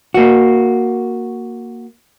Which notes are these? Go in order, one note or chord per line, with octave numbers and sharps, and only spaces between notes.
A#3 F#4